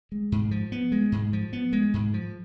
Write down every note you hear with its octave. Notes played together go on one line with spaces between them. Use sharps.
G#3
G#2
F3
B3
G#3
G#2
F3
B3
G#3
G#2
F3